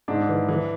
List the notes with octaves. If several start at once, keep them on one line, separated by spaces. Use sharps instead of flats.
G#2 D4
E3
E3